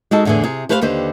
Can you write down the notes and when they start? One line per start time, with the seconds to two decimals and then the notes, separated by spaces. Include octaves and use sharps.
0.11 G#3 D#4 F#4 A4
0.25 E2 A2 D3 E3 G#4
0.44 C3 G#4
0.69 A3 G4 B4 C5 D5 F5
0.81 D#2 D3 G4 B4 C5